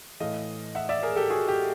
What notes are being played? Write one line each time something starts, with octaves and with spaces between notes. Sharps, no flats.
A2 E3 A3 D#5 F5
E5 F#5
D5 E5
G#4 A#4
G4 A4
F#4 G#4
G4